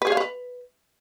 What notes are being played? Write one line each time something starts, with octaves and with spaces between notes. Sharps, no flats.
B4
G#4
F5
B4